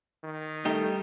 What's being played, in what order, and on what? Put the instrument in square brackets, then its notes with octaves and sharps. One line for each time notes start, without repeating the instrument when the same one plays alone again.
[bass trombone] D#3
[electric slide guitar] G3 G4 [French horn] A3 [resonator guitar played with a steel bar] D#4